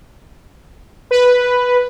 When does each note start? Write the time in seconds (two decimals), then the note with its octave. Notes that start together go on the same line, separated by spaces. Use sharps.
1.11 B4